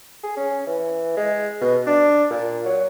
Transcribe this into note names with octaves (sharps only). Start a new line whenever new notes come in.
G#4
C#4
E3
G#3
B2
D4
A#2
F#3